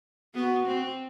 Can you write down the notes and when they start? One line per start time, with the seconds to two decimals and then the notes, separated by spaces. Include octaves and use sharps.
0.35 B3 F#4
0.67 C4